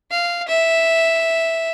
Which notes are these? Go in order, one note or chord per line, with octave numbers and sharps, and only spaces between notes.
F5
E5